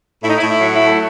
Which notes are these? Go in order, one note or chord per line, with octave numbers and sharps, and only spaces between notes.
A2 E4
D#4
E4
A2
E4
F#3
E4
A3